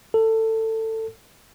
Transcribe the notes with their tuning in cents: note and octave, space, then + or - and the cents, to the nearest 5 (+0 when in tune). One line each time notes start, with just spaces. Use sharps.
A4 +20